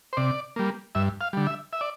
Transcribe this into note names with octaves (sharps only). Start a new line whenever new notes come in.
C5
C3 D5
G3 A#3
G2 E5
F5
D3 G3
E5
E5
D5